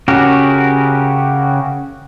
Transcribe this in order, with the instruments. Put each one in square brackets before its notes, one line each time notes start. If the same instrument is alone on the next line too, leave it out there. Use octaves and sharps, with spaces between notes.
[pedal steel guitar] C#3 C#4 F#4 G4 A#4